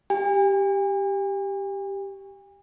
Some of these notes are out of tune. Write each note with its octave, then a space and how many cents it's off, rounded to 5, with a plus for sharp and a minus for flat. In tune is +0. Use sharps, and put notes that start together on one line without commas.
G4 +0 G#5 -45